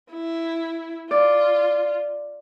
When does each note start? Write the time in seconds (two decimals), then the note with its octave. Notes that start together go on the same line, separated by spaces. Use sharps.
0.11 E4
1.11 F4 D5